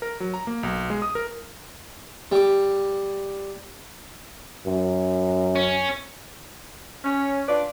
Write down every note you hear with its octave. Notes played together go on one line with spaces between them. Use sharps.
A#4
F#3
A#5
A#3
B1
G#3
D#6
A#4
G3 D6
F#2
C#4
C#4
D4 F4 B4 D5